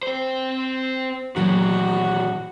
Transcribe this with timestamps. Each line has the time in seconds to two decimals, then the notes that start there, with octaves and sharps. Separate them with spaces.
0.03 C4 C5
1.36 F#2 A#2 D#3 E3 F#3 F#4